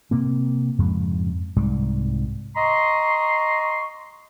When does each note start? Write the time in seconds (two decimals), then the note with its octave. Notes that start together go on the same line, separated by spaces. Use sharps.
0.11 C3 A#3 C4
0.79 F2 G#2 C#3
1.56 C2 G#2 G3
2.56 D#5 A#5 C6 C#6